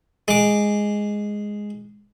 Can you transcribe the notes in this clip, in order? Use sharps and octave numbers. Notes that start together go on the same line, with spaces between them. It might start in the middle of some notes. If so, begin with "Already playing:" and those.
G#3 D6